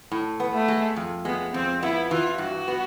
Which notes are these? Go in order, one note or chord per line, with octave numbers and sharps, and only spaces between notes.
A2
B3
A3
G#3
F2
G#3 B3
F2 C4
B3 E4
E3 F4
G2 F#4
B3